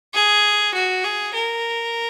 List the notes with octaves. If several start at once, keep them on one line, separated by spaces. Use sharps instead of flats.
G#4
F#4
G#4
A#4